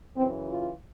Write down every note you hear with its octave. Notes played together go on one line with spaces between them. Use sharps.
F#2 C#3 E3 C4
F4